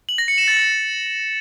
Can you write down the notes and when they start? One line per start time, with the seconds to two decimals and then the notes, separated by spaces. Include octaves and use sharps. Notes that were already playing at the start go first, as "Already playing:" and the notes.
0.09 F#7
0.18 A#6
0.28 C#7
0.38 E7
0.48 A6